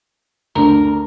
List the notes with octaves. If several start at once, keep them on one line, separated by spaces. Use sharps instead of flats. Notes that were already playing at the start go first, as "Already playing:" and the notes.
D2 D3 A#4